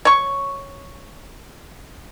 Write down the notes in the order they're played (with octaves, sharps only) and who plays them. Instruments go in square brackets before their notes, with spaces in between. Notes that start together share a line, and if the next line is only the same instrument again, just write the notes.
[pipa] C#5 C#6